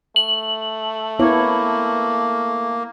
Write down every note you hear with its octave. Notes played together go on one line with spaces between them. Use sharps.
A3 F#7
A#3 B3 E4 C#5